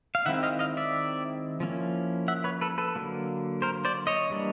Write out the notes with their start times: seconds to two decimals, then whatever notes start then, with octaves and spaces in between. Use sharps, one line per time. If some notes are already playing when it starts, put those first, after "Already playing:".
0.15 F5
0.26 D#3 G#3 C4 E4 E5 F#5
0.43 D#5 F5
0.59 D#5 F5
0.77 D5 E5
1.60 F3 A#3 C#4 E4
2.28 E5 F#5
2.44 B4 C#5
2.61 A4 B4
2.78 A4 B4
2.95 D3 F#3 A#3
3.62 A#4 C5
3.85 C5 D5
4.07 C#5 D#5
4.30 E3 G3 A#3 D4